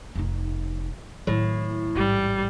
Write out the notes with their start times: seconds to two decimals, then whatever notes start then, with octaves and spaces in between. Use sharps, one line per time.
0.15 F1 D#4
1.27 A2 D#3 F#3
1.96 A1 G#2 G3